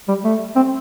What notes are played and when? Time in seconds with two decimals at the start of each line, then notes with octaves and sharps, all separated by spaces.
0.08 G3
0.24 A3
0.56 C4